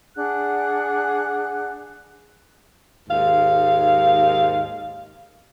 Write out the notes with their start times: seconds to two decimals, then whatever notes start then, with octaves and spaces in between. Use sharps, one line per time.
0.16 D4 G#4 F#5 F#6
3.09 D#2 G#2 F5